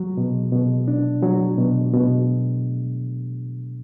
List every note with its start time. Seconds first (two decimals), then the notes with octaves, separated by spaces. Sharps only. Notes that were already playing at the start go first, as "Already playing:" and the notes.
Already playing: F#3
0.17 B2
0.53 B2
0.88 D4
1.23 F#3
1.58 B2
1.93 B2